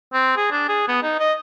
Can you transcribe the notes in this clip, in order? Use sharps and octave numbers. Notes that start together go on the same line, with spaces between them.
C4
G#4
D4
G#4
B3
D#4
D#5